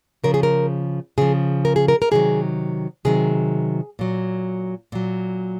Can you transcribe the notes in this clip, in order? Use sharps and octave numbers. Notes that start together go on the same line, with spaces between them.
C#3 F3 A#4
G#4
A#4
C#3 F3 G#4
A#4
G#4
A#4
A#4
C3 D#3 F#3 G#4
C3 D#3 F#3 G#4
A#2 F#3
A#2 F#3